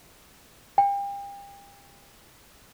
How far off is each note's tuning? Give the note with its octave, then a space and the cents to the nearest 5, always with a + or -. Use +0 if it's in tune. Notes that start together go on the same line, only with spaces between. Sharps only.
G5 +35